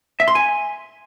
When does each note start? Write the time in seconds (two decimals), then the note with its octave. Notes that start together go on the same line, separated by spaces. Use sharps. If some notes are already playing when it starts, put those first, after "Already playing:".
0.20 E5
0.28 C6
0.35 G#5